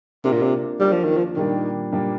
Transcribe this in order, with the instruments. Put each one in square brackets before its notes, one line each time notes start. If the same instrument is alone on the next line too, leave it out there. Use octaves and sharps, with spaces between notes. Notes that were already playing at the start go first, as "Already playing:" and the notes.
[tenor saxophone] C3 [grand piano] A#3 D4 F4 A#4
[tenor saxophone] A#2
C3
[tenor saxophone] G3 [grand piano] A#3 D4 F4 A#4
[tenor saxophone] F3
D#3
F3
[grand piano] A#2 G3 A#3 D4 [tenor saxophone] D#3
[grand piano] A#2 G3 A#3 D4